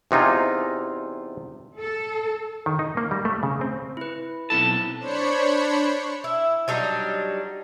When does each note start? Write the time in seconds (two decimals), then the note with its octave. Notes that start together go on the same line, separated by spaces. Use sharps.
0.11 E2 C3 D#4 F4 G#5
1.79 A4
2.66 D#3
2.79 D#4
2.97 A#3
3.11 G3
3.25 A3
3.43 C#3
3.61 C4
3.97 E4 B4
4.50 B1 G2 C4 E4 A4 A5
4.99 D4 C5 C#5 B5 C#7
6.24 E4
6.68 F#3 G3 D4 D#4